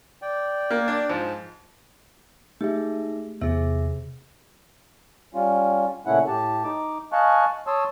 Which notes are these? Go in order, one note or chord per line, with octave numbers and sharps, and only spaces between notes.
D5 G5
A#3
D4
G#2 F3
A3 D#4 G4 G#4 E5
E2 C3 G#4 E5
G3 C#4 F4
A#2 C#3 A3 C#4 E4 F#5
A2 G4 A5
D#4 D6
D#5 F5 G#5 A5 C#6 F#6
C#5 A5 C6 D#6 E6